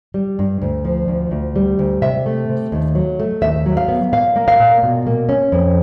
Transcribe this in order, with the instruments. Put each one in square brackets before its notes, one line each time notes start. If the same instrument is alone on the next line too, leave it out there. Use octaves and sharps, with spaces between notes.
[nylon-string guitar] G3
G2
D2
F3
D2
D2
G3
D2
C3 E5
A3
C3
D#2
F#3
A3
D#2 E5
F#3
F5
B3
A#2 F5
A#3
F5
A#2
B2
A#3
C#4
F2